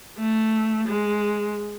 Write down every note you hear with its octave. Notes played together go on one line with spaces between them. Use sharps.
A3
G#3